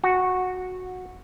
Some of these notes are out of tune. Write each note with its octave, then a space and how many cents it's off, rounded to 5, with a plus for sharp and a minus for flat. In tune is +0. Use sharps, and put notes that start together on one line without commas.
F#4 -10